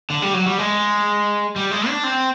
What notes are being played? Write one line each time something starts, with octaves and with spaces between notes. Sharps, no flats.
D3
G3
F#3
G3
G#3
G3
G#3
D4
C4